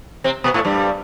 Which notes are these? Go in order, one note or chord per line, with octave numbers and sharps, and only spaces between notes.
C3 C4
B2 B3
A2 A3
G2 G3